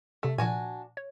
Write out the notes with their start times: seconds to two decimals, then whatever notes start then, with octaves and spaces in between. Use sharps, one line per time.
0.23 C3 A3 A4
0.38 A#2 F3 D4 F#4 G#5
0.97 C#5